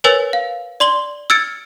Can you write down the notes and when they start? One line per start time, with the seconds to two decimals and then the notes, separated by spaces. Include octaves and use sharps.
0.04 A#4 B4 C#5 G#5 E6 A6
0.33 F5
0.80 D5 C6 F#7 G7
1.30 E6 F6 G#6 A6 C#7 D7